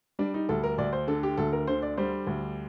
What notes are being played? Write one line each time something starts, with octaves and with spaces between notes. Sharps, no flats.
G3 D4
D#4
D2 A4
A#4
D2 D5
C5
D3 A4
G4
D2 A4
A#4
D3 C5
D5
G3 C5
D2